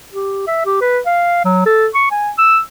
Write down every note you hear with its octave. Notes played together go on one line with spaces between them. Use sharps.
G4
E5
G4
B4
F5
F#3
A4
C#6
G#5
E6